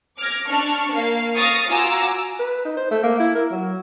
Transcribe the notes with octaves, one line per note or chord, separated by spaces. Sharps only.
D6 F6 G#6 A#6
D4 A5 C#6 F6
A#3 F5
C#6 D#6 F6 A6 A#6 C7
F4 F#4 G#5 A#5 D6 E6
B4
D#4
C5
A3
A#3
E4
A#4
F#3